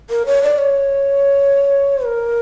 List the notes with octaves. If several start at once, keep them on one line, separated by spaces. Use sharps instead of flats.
A#4
C#5
D5
C#5
A#4